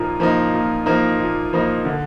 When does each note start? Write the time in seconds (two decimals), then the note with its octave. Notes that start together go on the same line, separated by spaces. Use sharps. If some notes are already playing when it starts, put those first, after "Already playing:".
Already playing: A#2 F3 A#3 D#4
0.20 F3 A#3 D#4
0.54 A#2
0.86 F3 A#3 D#4
1.19 A#2
1.53 F3 A#3 D#4
1.85 D3